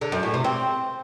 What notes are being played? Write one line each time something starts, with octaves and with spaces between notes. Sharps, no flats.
D3
F#2
A2
C3
C4